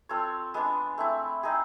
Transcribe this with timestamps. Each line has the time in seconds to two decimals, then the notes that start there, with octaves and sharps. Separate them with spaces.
0.09 C4 F4 A4 C#5
0.54 G#3 B3 D4
0.98 A3 C4 E4
1.43 C4 D#4 G#4